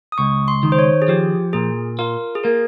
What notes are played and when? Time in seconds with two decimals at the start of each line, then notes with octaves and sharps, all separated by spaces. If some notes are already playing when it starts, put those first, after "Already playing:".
0.12 D#6
0.18 C#2 C#6
0.48 C6
0.63 D#3
0.72 C5
0.79 C#5
1.02 G#4
1.08 F3 G4
1.53 A#2 G#4
1.99 F4 A#4
2.35 G#4
2.44 A#3 A#4